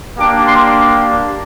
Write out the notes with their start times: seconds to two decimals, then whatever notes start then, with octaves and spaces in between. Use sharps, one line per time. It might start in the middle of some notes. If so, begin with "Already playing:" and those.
0.17 A#3 D4 G4 D6
0.44 C6